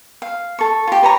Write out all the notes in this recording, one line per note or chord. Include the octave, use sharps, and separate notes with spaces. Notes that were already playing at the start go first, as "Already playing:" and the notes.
F5
A4 C#6
F4 G4
B4 C#5 A#5 C#6